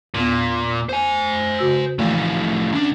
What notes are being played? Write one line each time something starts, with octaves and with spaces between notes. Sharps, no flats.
E2 A#2 B3
C5 G#5
C#3 F#4 E6
A2 E3 F3 A3 A#3
D2 C#4 D4